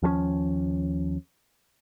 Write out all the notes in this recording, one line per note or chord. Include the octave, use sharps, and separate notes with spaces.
D#2 F3 G3 C#4